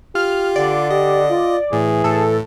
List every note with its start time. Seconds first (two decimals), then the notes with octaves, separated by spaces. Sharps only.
0.15 F4 G4 F6
0.56 D3 D5
0.90 G4 D#5
1.30 F4
1.73 A2 E3 G#4
2.04 A2 A4